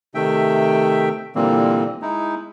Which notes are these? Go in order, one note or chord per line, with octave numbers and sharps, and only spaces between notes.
C3 D#3 A3 E5 G5
A#2 D3 E3 G3 A#3 C4
G#3 D#4 E4